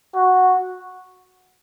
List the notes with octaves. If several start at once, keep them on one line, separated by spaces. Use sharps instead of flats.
F#4